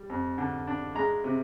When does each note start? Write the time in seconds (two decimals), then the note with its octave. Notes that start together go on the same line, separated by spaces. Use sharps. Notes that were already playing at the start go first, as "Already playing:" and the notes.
Already playing: G3
0.10 F2
0.38 D3
0.67 D4
0.95 G#3 A#5
1.24 C3